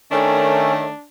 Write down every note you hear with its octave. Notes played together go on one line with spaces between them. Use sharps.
D#3 A3 C#4 D4 C#5